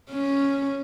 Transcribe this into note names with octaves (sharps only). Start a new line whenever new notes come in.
C#4